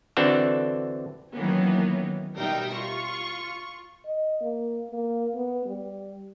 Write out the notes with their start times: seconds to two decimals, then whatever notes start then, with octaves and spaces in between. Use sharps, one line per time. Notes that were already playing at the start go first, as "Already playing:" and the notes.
0.17 D3 E3 C4 D4 F#4 A4
1.35 D#3 E3 F#3 A#3 B3 C#4
2.36 B2 G3 D#4 A#4 E5 G5
2.73 F4 C#6
4.06 D#5
4.41 A#3
4.91 A#3
5.35 B3
5.66 G3